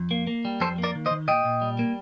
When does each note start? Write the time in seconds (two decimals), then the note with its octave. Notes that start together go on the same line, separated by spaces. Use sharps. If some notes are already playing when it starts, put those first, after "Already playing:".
Already playing: F2
0.11 A#3
0.27 A#3
0.45 G3
0.60 F2 A4 C5
0.78 A#3
0.83 A#4 D5
0.95 D#3
1.06 C5 D#5
1.11 D#3
1.28 A#2 D#5 G5
1.45 A#2
1.62 G3
1.79 A#3